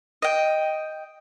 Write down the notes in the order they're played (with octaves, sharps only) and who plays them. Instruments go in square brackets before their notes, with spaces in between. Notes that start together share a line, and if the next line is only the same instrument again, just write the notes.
[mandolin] D#5 G5